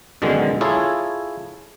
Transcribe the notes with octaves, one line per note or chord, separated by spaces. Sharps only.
F#2 B2 D3 D#3 G#3
E4 F4 G#4 A4 C#5